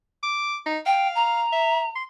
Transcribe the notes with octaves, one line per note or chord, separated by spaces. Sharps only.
D6
D#4
F5 G5
A#5
E5
C6